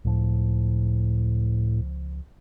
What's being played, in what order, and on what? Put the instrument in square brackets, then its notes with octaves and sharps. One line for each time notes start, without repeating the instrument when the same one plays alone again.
[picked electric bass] C#2 F3 [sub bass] A2